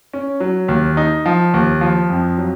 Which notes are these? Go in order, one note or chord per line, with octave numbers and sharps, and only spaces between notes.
C#4
F#3
D#2
D#4
F3
D#2
F3
F2
F#3